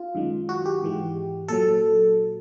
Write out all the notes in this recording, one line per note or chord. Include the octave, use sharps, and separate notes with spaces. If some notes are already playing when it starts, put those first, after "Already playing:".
Already playing: F4
F#2 D#3 G#3
F#4
G4
G#2 E3 G#3
A#2 F#3 A4